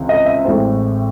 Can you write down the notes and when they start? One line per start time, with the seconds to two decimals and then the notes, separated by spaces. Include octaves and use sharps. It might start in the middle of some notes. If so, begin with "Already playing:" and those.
Already playing: C#2 C#3 E3 C4
0.09 D#5
0.26 E5
0.45 A1 A2 G#3 C4